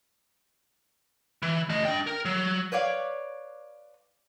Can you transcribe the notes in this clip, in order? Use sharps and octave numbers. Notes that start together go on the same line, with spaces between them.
E3
A3 D#5
D4 G5
A#4
F#3
B4 C#5 D5 F5